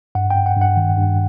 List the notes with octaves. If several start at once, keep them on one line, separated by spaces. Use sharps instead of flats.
G2 F#5
G2 G5
F#5
G2
F#5
D#3
G2